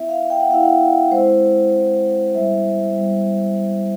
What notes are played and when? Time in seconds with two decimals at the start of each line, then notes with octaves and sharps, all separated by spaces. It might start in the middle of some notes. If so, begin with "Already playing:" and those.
Already playing: B3 E4 E5
0.09 F5
0.30 G5
0.41 F#5
0.49 B3 E4 F5
0.62 F#5
1.11 G#3 C4 E4 C5
1.73 G#3 C4 E4
2.35 G3 B3 E4 E5
2.96 G3 B3